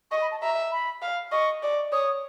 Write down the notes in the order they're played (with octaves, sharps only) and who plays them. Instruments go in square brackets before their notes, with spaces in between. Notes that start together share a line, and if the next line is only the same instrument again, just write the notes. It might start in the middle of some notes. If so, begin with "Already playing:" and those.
[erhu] D#5 [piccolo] C#6
[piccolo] B5
A5
[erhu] E5 [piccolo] A#5
[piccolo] B5
[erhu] F5
[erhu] D#5 [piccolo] C#6
[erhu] D5
[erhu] C#5 [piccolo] D#6